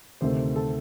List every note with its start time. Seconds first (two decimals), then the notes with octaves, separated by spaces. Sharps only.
0.21 D2 C3 D#3 A3 C5
0.56 A4